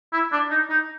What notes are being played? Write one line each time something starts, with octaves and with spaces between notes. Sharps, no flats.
E4
D4
D#4
D#4